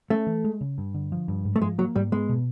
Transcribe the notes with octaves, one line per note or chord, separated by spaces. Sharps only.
A3 C#4
E3
G#3
C#3
G2
D3
F3
G2
G#2
A3
F3 G#3
F#3 A#3
G#2 G3
G#3 B3
B2